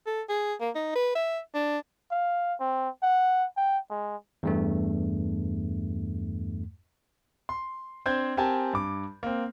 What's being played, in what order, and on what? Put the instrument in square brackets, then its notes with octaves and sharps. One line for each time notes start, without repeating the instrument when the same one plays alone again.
[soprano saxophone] A4
G#4
A#3
D#4
B4
E5
D4
[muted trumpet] F5
C4
F#5
G5
G#3
[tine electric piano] E2 G2 A3
[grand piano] C6
C4 D4 C5 G6 G#6
C4 G4 A#4 G#5 A5
G2 D6
A#3 C4